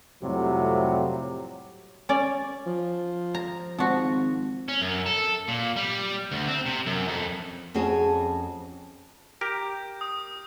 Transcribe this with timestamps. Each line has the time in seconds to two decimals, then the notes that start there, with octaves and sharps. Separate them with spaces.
0.23 F2 A2 C3 F#3 G3
2.09 C#4 D5
2.66 F3
3.35 A#5
3.78 G#1 F3 F#4
4.68 C#4
4.82 F#2
5.06 A4
5.48 A#2
5.76 G3
6.32 D2
6.48 C4
6.66 C3
6.86 F#2
7.08 F2
7.74 F2 C#4 F#4 G#4 A5
9.41 G4 A#4 G6
10.01 D#6